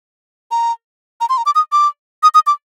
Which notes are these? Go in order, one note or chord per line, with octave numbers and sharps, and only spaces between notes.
A#5
A#5
C6
A#5
D6
D#6
D6
D#6
D#6
D6